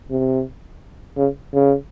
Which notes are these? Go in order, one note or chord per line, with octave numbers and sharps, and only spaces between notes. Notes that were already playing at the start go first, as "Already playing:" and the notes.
C3
C#3
C#3